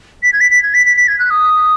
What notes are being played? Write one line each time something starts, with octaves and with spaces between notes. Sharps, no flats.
B6
G#6
B6
B6
G#6
B6
B6
B6
G#6
F#6
D#6